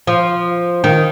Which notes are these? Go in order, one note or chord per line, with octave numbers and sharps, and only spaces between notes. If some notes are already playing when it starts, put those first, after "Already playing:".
F3
D#3